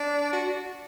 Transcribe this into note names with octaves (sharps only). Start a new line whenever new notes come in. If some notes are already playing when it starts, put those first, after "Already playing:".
Already playing: D4
F#4